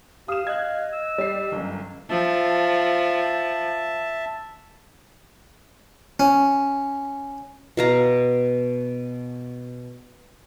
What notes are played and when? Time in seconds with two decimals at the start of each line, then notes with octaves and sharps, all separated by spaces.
0.28 G4 F5 D#6 E7
0.47 D#5 F#6 G#6
0.93 E6
1.18 G3 C7
1.52 G1 F#2
2.10 F3 E5 A5
6.20 C#4
7.77 B2 F5 A#5